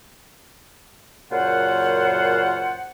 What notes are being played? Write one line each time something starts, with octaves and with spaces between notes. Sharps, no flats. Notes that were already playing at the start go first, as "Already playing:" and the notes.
F#2 A#2 C#3 F4 C5 F#5